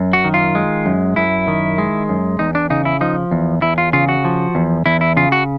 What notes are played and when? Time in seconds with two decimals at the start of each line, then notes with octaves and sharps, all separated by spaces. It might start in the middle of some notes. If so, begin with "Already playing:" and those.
Already playing: F#2
0.13 F#4
0.24 D#3
0.34 F4
0.55 G#3
0.86 F#2
1.16 F#2 E4
1.48 D#3
1.78 G#3
2.09 F#2
2.39 E2 D#4
2.55 D4
2.70 C#3 D#4
2.85 E4
3.01 F3 D#4
3.31 E2
3.62 E2 E4
3.78 F4
3.93 C#3 F4
4.09 F#4
4.24 F3
4.55 E2
4.86 E2 E4
5.01 E4
5.17 C#3 F4
5.32 F#4